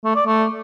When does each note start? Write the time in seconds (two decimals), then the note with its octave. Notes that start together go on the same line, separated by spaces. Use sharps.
0.05 A3
0.16 D5
0.27 A3